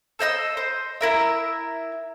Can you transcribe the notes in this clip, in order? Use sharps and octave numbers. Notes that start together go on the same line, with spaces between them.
A4 C5 D#5 E6
C5
E4 A#4 E5